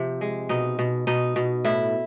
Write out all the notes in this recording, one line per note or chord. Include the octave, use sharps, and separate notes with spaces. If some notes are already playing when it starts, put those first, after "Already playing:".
Already playing: C3 F3
G#3
B2 D#4
B2
B2 D#4
B2
A2 E4